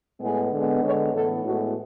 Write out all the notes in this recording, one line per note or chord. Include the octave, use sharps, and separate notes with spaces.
A2 G#3 B3 G#4
D3 G#3 B3
D3 G#3 B3 C#5
A2 E3 B3 A4
A2 G#3 B3 F#4